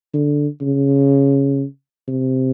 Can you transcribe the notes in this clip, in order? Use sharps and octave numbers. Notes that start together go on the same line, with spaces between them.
D3
C#3
C3